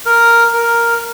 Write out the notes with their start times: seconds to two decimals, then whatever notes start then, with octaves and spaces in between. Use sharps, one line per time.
0.06 A#4
0.54 A#4